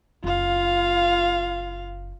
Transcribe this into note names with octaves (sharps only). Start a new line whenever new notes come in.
F#1 F4 F5